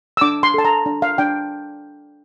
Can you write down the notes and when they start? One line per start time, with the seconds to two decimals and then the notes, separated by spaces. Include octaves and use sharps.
0.17 E6
0.21 D4 D6
0.43 C6
0.54 A4 A5
0.65 A#5
0.86 D4
1.02 F5
1.18 D4 G5